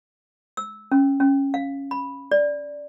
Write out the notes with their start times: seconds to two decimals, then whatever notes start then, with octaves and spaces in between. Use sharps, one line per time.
0.57 E6
0.92 C#4
1.20 C#4
1.54 F5
1.91 B5
2.32 D5